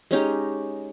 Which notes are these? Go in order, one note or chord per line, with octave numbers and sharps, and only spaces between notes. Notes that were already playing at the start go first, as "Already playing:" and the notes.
G#3 C#4 D#4 G4